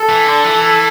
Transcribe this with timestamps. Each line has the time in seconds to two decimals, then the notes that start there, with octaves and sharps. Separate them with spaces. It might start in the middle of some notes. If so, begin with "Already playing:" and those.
Already playing: A4
0.09 E3
0.26 D3
0.44 E3